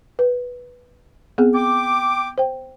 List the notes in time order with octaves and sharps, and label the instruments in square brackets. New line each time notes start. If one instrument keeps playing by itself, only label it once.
[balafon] B4
B3 C4 G#4
[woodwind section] G5 D6
[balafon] C5 G5